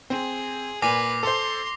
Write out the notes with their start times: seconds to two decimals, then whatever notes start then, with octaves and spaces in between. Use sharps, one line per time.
0.10 C4 G#4
0.82 A#2 B4 G#5 D6 A#6 C7
1.23 A4 C5 C6